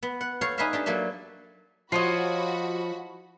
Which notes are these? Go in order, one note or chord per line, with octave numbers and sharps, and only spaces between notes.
B3
F#5
A4 C5 C#5 F5
D#4 G#4 B4 D5 E5 F5
D4 G4 A4
F#3 A#3 A4 D5 E5
F3 F4 F#4 C#5 D#5 F#5 B5